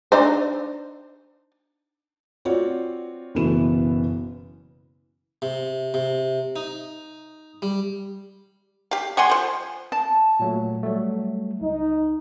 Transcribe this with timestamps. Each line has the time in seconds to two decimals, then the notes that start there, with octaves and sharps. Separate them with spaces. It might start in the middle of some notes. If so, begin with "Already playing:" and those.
0.12 D4 D#4 C5
2.45 C4 F4 F#4 C#5 D5
3.35 F#1 B2 E3 B3 E7
5.42 C3
5.94 C3
6.56 D#4
7.62 G3
8.91 G4 F5
9.17 G3 F#5 G#5 C6
9.30 F3 C5
9.92 A5
10.40 A#2 F#3 A3
10.83 F#3 G3 A3
11.61 C#2 D#4